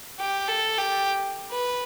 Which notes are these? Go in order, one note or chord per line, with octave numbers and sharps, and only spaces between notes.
G4
A4
G4
B4